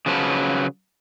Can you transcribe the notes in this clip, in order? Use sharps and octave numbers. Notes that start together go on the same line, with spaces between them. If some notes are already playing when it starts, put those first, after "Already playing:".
C#3 F3 F#3 B4 A5